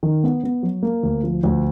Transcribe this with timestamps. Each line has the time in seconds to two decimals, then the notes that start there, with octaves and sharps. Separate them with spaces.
0.03 D#3
0.24 B3
0.44 B3
0.63 F#3
0.83 A#3
1.03 D2
1.24 F3
1.43 D2